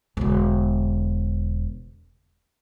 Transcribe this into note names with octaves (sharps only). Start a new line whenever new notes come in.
E1 D3